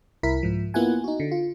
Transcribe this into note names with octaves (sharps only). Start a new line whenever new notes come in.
C2 E4 A#4 B6
G#2 F3
A#3 B3 E4 F4 F#5 G#5
D#4 F#4
D3
F4